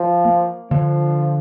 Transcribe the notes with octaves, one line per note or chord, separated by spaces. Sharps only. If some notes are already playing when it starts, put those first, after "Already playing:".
Already playing: F3
A#3
D3 F3